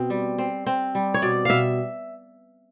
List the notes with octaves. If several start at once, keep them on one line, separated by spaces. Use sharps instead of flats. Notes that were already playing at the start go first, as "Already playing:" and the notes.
Already playing: B2 C4
G3
C4
C4
G3
C#5
B2 D5
B2 E5 F5